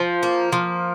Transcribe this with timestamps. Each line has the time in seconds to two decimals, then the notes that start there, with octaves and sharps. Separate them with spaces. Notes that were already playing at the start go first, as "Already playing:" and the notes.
Already playing: F3
0.23 A#3
0.52 F3